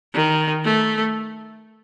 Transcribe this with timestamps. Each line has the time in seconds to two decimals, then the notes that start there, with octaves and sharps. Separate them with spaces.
0.14 D#3
0.64 A3